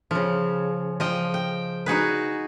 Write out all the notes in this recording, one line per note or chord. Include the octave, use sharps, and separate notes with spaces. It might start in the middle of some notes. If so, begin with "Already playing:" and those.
C#3 F3
F3 D#5 G5
G5
D#4 F#4 G#4 B4